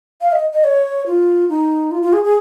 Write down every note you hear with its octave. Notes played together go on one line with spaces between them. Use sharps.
F5
D#5
D#5
C#5
F4
D#4
F4
F4
G#4
G#4